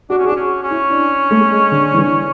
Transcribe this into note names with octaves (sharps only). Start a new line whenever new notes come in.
D4 F#4
C#4
G#4
D4 F#4
C#4
C#4
E4
D4
A3
A3
G#3
D3
E3
D3